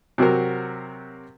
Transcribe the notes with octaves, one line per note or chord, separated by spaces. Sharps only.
C3 F#3 C4 F#4 A#4